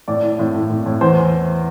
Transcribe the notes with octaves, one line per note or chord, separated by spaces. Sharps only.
A2 D5
E4
A2
A2
A2
A2
E2 C5